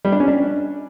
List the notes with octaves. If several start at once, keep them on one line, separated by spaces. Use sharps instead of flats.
G3
D4
C#4
D4